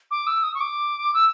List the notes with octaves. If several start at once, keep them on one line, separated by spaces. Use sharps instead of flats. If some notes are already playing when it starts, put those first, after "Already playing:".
D6
E6
D#6
C#6
D6
E6